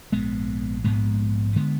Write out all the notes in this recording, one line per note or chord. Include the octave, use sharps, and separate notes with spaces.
A#1 G#2 G#3 B3
A#1 G#2 G#3 B3
D3 G#3 B3